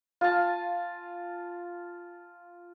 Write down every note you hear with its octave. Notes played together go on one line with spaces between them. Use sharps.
F4 F5 G#5 A5